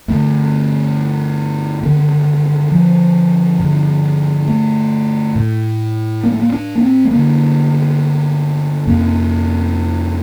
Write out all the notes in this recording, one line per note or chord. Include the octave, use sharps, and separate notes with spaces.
G2 D3 A3
G2 D3 D#3
F3
G2 D3
A3
A2
A#3
A3
A#3
D4
A#3
C4
A3
G2 D3 A#3
F2 C3 A#3